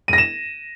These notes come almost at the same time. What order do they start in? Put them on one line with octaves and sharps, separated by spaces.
D#7 A#6 E7